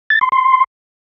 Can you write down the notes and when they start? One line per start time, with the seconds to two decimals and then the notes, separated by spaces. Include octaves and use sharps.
0.10 A6
0.21 C6
0.32 C6